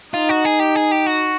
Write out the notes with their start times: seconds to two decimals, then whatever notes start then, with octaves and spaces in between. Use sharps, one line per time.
0.14 D#4 F4
0.29 F#4
0.45 G#4
0.60 G4
0.75 G#4
0.91 G4
1.06 F#4